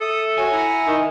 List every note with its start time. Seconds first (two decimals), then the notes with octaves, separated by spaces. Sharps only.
0.01 A4 E5 D#6
0.38 F#4 C#5 G#5
0.52 E4 F#5 A#5
0.87 D#3